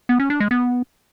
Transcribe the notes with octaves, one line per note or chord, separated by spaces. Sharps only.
B3
C#4
D4
G#3
B3